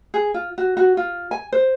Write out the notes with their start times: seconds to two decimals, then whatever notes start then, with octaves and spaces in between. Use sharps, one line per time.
0.14 G#4
0.34 F4
0.58 F#4
0.77 F#4
0.97 F4
1.31 G#5
1.52 C5